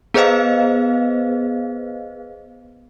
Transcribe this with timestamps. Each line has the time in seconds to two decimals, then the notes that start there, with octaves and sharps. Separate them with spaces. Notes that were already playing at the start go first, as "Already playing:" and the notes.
0.14 B3 G#4 B4 C5 D#5 F5